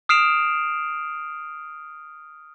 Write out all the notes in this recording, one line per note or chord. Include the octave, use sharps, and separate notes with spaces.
D#6 F6 C7 D7 E7 F7